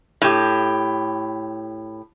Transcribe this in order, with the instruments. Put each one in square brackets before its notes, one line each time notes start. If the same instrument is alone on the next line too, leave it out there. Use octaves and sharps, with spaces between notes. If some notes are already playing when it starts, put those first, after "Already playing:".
[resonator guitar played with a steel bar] A2 G4